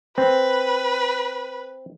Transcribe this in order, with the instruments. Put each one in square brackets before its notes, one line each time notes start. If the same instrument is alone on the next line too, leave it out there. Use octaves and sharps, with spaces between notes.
[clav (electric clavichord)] C4 [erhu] B4